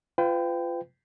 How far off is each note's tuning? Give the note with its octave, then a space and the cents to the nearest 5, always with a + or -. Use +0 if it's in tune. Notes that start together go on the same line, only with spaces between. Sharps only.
F4 -15 B4 +40 G5 +0